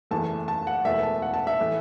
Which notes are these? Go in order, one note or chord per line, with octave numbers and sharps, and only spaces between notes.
F#1 E2 E3 A3 A5
A5
F#5
E1 E2 E3 A3 E5
A5
F#5
A5
E5
A2 E3 A3